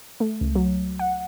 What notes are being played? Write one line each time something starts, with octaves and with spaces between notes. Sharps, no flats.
A3
C#2
F#3
F#5